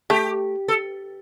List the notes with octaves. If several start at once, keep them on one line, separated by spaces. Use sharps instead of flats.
A3 G4
A4